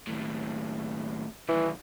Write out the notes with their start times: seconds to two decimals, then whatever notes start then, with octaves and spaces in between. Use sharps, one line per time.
0.07 D#2 A2
1.49 B1 D#3 E3